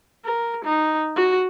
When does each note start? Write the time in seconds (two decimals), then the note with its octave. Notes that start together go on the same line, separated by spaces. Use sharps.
0.25 A#4
0.64 D#4
1.16 F#4